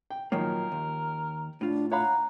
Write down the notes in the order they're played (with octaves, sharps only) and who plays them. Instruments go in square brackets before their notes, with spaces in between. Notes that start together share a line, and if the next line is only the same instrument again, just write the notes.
[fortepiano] G5
[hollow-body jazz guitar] A#2 F#3 A#3 [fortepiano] D#3 F3 C#5 [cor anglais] A#4
[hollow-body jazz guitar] D#2
[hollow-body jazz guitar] A2 F4 [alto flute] D4
[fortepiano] C#5 F5 B5 [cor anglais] F#5 [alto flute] A#5